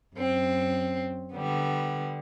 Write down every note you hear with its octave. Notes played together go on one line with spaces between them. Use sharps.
F#2 C4
D3 G3 B3